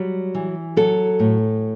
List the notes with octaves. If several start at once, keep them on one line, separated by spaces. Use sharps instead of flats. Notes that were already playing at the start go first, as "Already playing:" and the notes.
Already playing: F#3 G3
E3
F#3 A4
A2